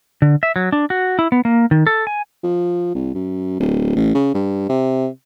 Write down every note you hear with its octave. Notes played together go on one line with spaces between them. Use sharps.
D3
E5
F#3
D4
F#4
E4
B3
A#3
D#3
A4
G#5
F3
C2
F#2
D1
A1
C#3
G2
C3